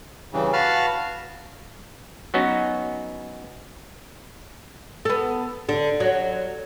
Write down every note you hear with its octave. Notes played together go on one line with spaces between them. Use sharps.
G2 C#3 E3
F#4 B4 F5 A5 F6
F#3 B3 C#4 D#4 F#4
B3 A4
D3
F#3